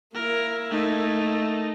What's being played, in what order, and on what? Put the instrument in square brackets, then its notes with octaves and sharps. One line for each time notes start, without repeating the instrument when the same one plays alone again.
[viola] A#3 E4 [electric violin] A#4
[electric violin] A3 D#4